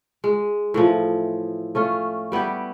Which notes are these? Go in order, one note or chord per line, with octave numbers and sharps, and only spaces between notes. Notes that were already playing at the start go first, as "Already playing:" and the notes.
G#3
A2 E3 F3
A3 C#4 F4
G3 B3 E4 G4